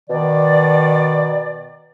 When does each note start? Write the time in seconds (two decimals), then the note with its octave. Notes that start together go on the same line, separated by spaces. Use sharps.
0.10 B2 D#3 D5